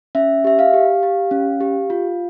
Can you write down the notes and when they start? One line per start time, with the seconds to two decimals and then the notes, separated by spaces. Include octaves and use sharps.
0.15 C#4 E5
0.44 G4 E5
0.59 F5
0.73 G4
1.03 G4
1.31 C#4
1.61 G4
1.90 F4